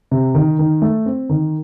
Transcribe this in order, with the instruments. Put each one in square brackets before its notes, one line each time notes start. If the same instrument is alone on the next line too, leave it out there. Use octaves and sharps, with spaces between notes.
[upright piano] C3
D#3
D#3
A3
C4
D#3